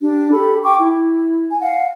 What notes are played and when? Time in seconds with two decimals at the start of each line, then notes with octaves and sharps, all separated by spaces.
0.01 D4 G4
0.32 G4 A4 B5
0.62 G5 C#6 D6
0.79 E4
1.49 G#5
1.62 F5 F#5